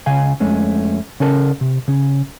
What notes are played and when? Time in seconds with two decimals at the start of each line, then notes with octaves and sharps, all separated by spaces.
0.06 C#2 C#3 F5 G#5
0.40 F2 G#3 A3 C#4
1.20 C#3 C#4 A4 A#4 A5
1.61 C3
1.88 C#3 C#4